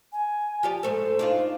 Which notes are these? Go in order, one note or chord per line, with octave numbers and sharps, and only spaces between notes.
G#5
F3 G4 D5
G#2 A3 A4 C5
D4 D#4 F4